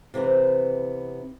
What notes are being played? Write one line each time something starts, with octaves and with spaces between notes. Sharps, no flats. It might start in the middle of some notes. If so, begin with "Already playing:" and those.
C3 E3 B3 C4